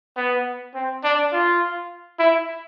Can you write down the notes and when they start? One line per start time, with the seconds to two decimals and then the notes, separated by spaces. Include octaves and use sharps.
0.17 B3
0.75 C4
1.04 D4
1.33 F4
2.19 E4